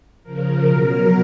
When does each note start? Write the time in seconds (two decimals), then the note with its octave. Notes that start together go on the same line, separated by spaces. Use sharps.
0.23 C#3 F3 A#4
0.66 B2 F#3 A#4